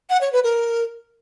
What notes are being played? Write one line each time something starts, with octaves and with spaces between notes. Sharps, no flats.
F#5
C#5
B4
A#4